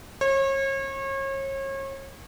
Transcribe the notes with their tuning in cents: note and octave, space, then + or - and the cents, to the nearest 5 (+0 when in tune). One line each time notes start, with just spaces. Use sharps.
C#5 -35